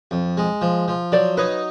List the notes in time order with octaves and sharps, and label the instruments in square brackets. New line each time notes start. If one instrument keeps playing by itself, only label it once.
[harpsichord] F2
G#3
F3
F3
[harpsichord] F#3 [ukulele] C5 D5
[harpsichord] D#4 [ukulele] B4 C#5